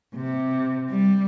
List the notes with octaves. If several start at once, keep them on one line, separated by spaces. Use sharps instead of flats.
C3
G3